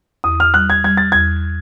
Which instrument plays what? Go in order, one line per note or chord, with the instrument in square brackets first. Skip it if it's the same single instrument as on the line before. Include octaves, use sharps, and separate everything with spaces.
[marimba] E2 [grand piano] D#6
[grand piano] F6
[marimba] G3 [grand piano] F#6
[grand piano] G#6
[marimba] G3 [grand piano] G#6
[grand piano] A6
[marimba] E2 [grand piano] G#6